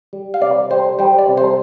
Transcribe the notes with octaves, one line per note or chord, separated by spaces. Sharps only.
G3
F5
C3 D5
G3 C5
G3 C5
D5
C3
C5